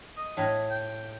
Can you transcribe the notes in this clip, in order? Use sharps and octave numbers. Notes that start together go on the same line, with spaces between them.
D#5
A2
G5